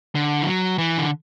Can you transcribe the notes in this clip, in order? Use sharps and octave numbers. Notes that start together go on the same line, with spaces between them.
D3
E3
F#3
E3
D3